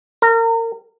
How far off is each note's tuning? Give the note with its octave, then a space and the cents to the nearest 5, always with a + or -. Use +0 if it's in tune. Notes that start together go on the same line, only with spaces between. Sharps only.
A#4 -30